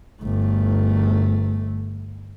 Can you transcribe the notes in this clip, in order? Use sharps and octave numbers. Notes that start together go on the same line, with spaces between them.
G1 A3